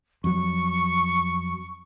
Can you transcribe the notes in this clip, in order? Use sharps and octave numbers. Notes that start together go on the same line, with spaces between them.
F2 F#3 C#6